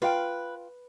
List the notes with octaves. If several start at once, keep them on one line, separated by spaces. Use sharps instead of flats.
F4 B4 F5 G5